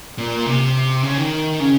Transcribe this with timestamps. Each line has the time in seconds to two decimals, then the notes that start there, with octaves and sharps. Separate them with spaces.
0.18 A#2
0.46 C3
1.03 C#3
1.17 D#3
1.60 C#3